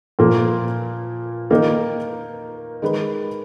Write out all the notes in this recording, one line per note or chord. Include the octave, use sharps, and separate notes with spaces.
A#2 F3 A#3
D#3 A#3 D#4 A#4
D#3 G#3 D#4 G#4 B4